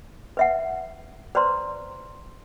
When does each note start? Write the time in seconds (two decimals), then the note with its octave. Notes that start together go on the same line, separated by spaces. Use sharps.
0.37 B4 E5 F#5
1.35 B4 C5 D5 A#5 C6